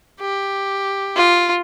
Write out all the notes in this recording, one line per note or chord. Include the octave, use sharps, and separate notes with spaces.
G4
F4